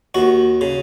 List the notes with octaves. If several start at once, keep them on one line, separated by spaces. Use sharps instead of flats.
D#2 F#4
C#3